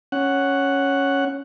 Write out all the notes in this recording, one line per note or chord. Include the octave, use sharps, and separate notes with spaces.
C#4 F#5